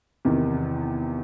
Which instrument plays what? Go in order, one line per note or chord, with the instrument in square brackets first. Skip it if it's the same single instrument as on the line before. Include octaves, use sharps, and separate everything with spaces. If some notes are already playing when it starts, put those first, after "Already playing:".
[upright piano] E2 C3 D#3